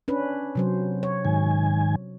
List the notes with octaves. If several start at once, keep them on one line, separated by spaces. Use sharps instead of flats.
C#4 D4 B4
C3 F#3 C5
C#5
G#2 D#3 G#5